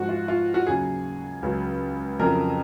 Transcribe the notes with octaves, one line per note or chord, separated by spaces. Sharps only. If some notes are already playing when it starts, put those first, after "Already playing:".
Already playing: G#2 F3 F#4
F4
F4
F#4
D#2 C#3 F#3 G#4
C#2 C#3 F#3
F2 C#3 F#3 A#4